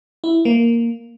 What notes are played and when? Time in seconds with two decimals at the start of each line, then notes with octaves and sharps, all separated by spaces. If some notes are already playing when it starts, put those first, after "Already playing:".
0.24 E4
0.45 A#3